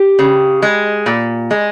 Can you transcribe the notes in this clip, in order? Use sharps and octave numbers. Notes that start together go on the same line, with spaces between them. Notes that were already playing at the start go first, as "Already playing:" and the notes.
Already playing: G4
C#3
G#3
A#2
G#3